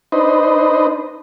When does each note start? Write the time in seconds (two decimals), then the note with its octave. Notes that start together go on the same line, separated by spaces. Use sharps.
0.12 D4 D#4 B4 C5 D#5